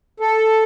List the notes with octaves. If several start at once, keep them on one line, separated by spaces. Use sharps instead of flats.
A4